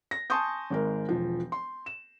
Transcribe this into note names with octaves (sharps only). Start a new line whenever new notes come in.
A#6
G#5 A5 C6 C#6 D#6 G6
G#1 G#3 A#4
E1 F3
C6
E7